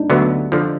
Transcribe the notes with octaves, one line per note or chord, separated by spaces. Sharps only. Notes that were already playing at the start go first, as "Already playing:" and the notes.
Already playing: D4 D#4
D2 D3 F#3 B3
D3 F3